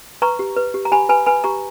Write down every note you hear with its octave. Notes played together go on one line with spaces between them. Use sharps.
B4 A#5 C#6
G4
B4
G4
A#5
G4 G#5 B5
B4 G#5 B5
B4 G#5 B5
G4 A#5 C#6